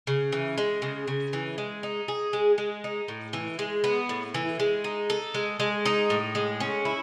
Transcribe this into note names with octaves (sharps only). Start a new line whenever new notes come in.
C#3
E3
G#3
C#3
C#3
E3
G#3
D#4
G#4
G#3
G#3
D#4
A2
E3
G#3
B3
A2
E3
G#3
D#4
A4
G#3
G#3
D#4
A2
G#3
C#4
E4